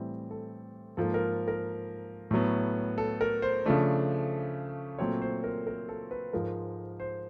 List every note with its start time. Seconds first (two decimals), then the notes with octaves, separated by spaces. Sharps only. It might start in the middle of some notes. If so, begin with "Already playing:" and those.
Already playing: A2 E3 G3 C4
0.31 A4
0.97 G#2 F3 A#3 A4
1.14 A#4
1.48 A#4
2.31 A2 F#3 B3
2.98 A4
3.21 A#4
3.42 C5
3.65 C#3 F3 A3 D4
4.99 A#2 F#3 A3 C4 C#5
5.22 C5
5.44 A#4
5.67 A#4
5.89 A4
6.11 B4
6.33 G#2 F3 G#3 A#4
7.00 C5